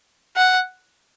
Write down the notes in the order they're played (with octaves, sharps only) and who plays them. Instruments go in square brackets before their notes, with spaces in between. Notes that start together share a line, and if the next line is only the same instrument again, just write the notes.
[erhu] F#5